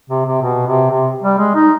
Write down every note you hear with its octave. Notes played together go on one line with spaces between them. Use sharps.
C3
C3
B2
C3
C3
G3
G#3
D#4